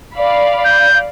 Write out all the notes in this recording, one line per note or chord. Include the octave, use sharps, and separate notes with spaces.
D5 F5 B5
G6